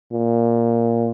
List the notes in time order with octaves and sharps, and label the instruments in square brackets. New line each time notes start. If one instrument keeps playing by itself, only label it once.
[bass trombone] A#2